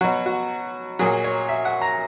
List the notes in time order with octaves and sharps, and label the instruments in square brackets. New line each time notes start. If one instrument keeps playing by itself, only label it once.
[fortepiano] B2 F#3 F#4
F#4
A#2 F#3 G#4
C#5
E5
F#5
A#5